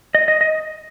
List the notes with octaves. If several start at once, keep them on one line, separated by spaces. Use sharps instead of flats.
D#5
D#5
D#5